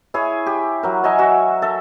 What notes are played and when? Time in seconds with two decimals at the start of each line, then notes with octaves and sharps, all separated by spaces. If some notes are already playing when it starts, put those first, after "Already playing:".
0.14 E4 G#4 C#5
0.46 G4
0.83 F#3 A#4
1.04 C#5 D#5 E5 G#5
1.19 F#4 E5
1.62 A4 E5